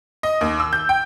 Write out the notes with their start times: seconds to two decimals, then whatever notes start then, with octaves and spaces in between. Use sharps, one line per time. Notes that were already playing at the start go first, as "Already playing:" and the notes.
0.23 D#5
0.41 D#2
0.59 E6
0.73 G6
0.89 G5